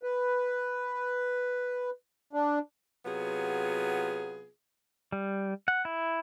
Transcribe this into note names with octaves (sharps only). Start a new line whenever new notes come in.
B4
D4
C3 F#3 B3 F4 G#4
G3
F#5
E4